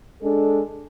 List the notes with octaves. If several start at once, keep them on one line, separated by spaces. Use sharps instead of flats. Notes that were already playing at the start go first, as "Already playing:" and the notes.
G#3 D4 A4